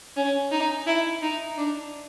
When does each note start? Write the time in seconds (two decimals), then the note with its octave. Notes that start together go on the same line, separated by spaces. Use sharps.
0.17 C#4
0.51 D#4
0.87 E4
1.22 D#4
1.58 D4